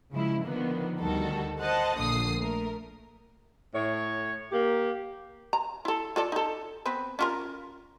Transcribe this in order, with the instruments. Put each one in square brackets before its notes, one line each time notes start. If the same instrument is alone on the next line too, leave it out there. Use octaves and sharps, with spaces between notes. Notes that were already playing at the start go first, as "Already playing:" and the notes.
[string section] C#3 F3 G#3 E4
D3 D#3 F3 A#3 B3
D2 D#3 G3 F#4 A4
C5 D#5 F#5 A5
A#1 A#2 D3 F3 D#6 C7
A3 A#4
[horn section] A2 C#5
A#3 G4
[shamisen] A#5
E4 A4
F4 A4 D5
D#4 A4
B3 C4 B4
C#4 F4 A#4